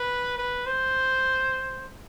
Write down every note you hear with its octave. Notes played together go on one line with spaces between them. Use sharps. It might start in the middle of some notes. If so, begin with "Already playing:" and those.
Already playing: B4
B4
C5